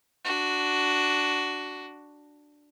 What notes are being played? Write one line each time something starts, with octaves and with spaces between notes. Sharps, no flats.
D4 F#4